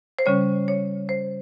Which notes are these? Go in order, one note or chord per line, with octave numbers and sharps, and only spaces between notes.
C5
C#3 G3 C#4 C#5
C#5
C5